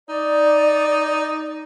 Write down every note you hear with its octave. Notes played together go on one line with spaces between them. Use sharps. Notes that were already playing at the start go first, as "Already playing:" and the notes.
D#4 D5